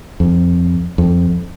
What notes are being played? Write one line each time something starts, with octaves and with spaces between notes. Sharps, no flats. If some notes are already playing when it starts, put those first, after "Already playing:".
F2
F2